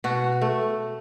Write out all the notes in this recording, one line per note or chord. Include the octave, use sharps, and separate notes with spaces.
B2 F#4
A3